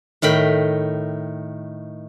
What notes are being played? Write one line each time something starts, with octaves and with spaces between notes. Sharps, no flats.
A2 D#3 G5 B5